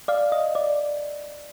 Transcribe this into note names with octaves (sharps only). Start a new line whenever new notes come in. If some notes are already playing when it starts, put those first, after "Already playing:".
D5 F5
D#5
D5